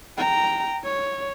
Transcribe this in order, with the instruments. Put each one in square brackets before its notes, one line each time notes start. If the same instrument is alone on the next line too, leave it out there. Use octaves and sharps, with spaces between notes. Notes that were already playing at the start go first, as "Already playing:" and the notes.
[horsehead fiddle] G5 A#5
C#5